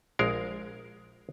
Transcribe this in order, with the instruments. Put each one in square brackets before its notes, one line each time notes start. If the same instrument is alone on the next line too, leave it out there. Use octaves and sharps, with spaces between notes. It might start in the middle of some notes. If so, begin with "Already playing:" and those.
[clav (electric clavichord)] A#1 G#3 A#4 F5